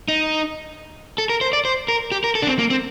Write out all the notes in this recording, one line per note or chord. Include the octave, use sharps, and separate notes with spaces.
D#4
A4
A#4
C5
D5
C5
A#4
G4
A#4
A4
D4
C4
A#3
C4